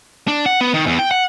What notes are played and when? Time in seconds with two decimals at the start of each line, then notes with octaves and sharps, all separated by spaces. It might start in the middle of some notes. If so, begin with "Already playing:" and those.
0.28 D4
0.46 F#5
0.61 B3
0.74 D#3
0.86 E2
0.99 G5
1.11 F#5